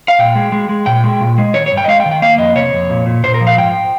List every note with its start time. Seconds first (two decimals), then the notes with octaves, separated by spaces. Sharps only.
0.08 F5
0.19 A#2 G5
0.35 G#3
0.52 G#3
0.69 G#3
0.86 A#2 G5
1.04 G#3
1.21 A#2
1.38 G#3
1.54 D#3 C#5
1.66 C#5
1.72 G2
1.77 G5
1.84 D#5
1.88 G#3 F5
2.00 G5
2.06 D#3
2.11 G5
2.22 A#3 F5
2.38 F2 D#5
2.55 C3 C#5
2.73 F2
2.90 A#2
3.06 A#2
3.24 A#2 C5
3.34 A#4
3.41 F3
3.47 F5
3.58 G#2 G5